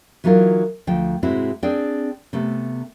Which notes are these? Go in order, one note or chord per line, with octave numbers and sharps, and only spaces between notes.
E3 F#3 D#4 F4 A#4
D2 F3 G5
G#2 C3 G#3 C4 E4 F#4
C4 D4 G#4 D5 G5
C3 A3 B3